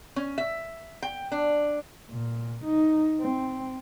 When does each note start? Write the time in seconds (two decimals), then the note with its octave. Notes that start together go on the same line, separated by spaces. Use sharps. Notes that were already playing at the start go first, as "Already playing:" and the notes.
0.16 C#4
0.38 E5
1.03 G5
1.32 D4
2.10 A#2
2.65 D#4
3.21 C4